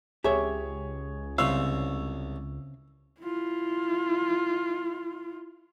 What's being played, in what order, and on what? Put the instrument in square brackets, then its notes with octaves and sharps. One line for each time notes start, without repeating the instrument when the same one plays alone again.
[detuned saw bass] C#2 [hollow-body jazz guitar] G4 E5 [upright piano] G#4 C#5
[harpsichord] C2 C#5 [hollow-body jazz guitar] C#3 C4 F5 [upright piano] E6
[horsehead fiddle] E4 F4